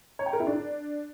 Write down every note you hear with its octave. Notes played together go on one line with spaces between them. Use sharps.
C#5
G5
A#4
E4
D4